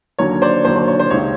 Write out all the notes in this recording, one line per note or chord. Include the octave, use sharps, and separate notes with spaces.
D#2 D3 F#3 A#3 C#5
C5 D5
D#2 D3 F#3 A#3 C5
C5
C#5
C5
C#2 C3 D#3 C#5